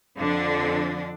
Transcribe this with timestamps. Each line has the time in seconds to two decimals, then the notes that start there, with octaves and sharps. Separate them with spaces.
0.19 F2 D3 F3 D4